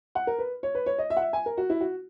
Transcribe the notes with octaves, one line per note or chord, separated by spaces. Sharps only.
F#5
A#4
B4
C#5
B4
C#5
D#5
E5
F#5
E5
G#5
A#4
F#4
E4
F#4